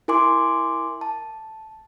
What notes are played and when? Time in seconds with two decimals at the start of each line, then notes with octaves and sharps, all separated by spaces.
0.08 E4 A#4 G#5 C6 D6
1.01 A5